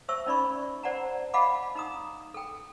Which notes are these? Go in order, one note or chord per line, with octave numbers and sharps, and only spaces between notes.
C5 E5 A5 C#6 E6
C#4 D#4 D5 B5 C#6
C5 D5 F#5 A5 A#5
D#5 F5 F#5 A5 B5 D6
D#4 A#5 D#6
A4 G5